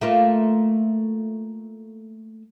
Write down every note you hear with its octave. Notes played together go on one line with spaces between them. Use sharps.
A3 A#3 F4